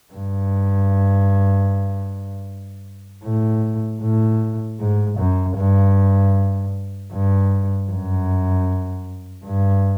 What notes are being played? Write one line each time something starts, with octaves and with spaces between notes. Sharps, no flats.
G2
A2
A2
G#2
F#2
G2
G2
F#2
G2